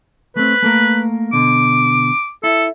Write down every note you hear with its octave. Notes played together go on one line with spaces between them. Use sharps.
A3 C4 B4
A3 A#3 A#4
B2 D3 D6
E4 A4